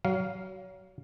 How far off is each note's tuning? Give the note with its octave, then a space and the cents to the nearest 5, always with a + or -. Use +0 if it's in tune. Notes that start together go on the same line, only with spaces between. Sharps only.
F#3 +25 F5 +0